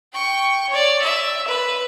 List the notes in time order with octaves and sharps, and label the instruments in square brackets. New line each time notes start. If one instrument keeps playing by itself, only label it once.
[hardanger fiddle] G5 C#6
C#5 D5
E5
B4